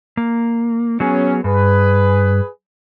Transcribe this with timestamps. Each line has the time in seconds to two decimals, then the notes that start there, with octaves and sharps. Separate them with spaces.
0.17 A#3
1.00 F#3 B3 C#4 G#4
1.44 G2 G#4 B4